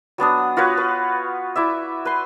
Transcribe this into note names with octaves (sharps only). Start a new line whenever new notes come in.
F#3 B3 D4 D#6
F4 F#4 B4 C#5
B4
E4 D5 E5
B4 C6